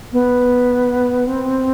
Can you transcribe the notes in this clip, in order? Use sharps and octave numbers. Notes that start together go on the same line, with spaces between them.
B3
C4